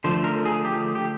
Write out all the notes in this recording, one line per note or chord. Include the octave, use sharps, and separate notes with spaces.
D3 F3 A3 C5
A#4
G#4
G4
G4